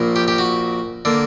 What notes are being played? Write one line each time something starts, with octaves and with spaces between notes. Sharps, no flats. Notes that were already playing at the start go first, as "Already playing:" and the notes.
Already playing: A#1 A#2 A#3
G4
G4
F#4
D3 A#3